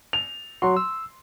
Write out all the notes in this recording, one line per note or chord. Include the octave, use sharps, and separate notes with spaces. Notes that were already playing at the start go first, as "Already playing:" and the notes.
F7
F#3 F#4 C6
E6